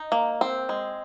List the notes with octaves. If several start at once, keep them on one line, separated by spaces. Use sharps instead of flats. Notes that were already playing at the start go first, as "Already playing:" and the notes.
Already playing: D#4
A#3
C4
G#3